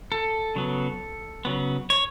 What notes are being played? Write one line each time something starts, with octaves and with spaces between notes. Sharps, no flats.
A4
C#3 F#3 B3
C#3 F#3 B3
C#5